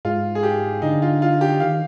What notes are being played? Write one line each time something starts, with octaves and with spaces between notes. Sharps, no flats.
G#2 F4
G#4
G4
D3 D#4
F4
F4
G4
D#3 F5